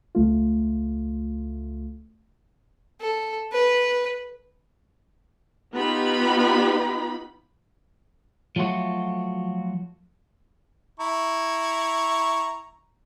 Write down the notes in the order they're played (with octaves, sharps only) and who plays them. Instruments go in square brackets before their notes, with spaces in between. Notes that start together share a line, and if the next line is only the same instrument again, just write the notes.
[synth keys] C#2 A3 F4
[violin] A4
B4
[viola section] B3 D#4 F4 G4 B5
[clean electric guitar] F3 F#3 A3 F4 F#4
[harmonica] E4 A#5 C#6